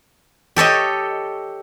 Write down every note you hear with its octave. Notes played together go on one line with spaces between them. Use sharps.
G4 A4 C#5 D#5